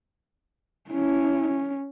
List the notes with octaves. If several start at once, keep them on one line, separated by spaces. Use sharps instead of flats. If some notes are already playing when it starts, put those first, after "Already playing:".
C#4 E4
C#4